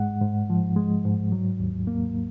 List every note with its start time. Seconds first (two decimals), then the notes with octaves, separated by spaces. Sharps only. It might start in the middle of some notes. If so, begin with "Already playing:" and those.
Already playing: G#2 G#3 F#5
0.21 G#2
0.50 F3
0.76 G#3
1.05 G#2
1.32 F#3
1.60 D#2
1.87 A#3